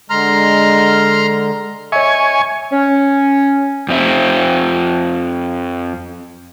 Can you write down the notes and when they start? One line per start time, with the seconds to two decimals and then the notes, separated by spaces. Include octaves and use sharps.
0.10 D3 G#3 A#5 C6 F6
1.92 C#5 D#5 E5 G#5 C#6
2.72 C#4
3.88 F2 C4 E5